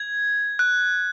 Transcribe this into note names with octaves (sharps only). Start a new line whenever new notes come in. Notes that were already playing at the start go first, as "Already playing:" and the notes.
Already playing: G#6
F#6